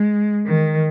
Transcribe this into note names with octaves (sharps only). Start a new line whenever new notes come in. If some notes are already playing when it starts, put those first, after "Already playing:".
Already playing: G#3
D#3